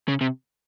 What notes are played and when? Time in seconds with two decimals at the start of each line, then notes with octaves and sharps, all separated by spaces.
0.08 C#3
0.21 C3